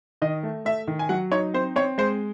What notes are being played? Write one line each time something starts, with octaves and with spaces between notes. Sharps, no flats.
D#3 D#5
A3
A3 E5
D#3
G#5
F#3 F#5
D#4 C#5
C4 C5
C4 C#5
G#3 C5